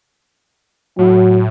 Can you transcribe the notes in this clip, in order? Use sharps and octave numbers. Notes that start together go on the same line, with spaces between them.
A2 F#3